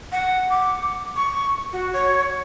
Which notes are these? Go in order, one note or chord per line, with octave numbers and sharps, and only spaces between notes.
F#5
D6
C#6
F#4
C#5